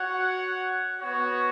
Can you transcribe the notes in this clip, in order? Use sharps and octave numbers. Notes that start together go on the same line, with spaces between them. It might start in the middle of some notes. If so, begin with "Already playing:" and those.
Already playing: F#4 C#5 F#5
B3 F#4 C#5